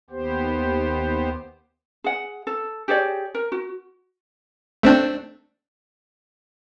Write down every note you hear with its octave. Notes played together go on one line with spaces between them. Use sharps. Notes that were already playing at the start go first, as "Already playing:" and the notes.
D#2 B3 G4 C5
G#4 F#5
A4
G4 G#4 C#5 D5
A#4
F#4
A3 C4 D4